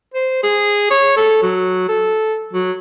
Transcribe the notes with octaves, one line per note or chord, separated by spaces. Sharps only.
C5
G#4
C#5
A4
F#3
A4
F#3